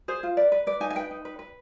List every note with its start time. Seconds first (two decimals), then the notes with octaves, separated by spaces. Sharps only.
0.08 G#4 C5
0.23 F4
0.37 B4 D5
0.52 B4
0.67 B4 D5
0.80 D#4 G#5
0.90 G#5
0.95 B4 G5
1.11 D#4
1.25 B4
1.39 B4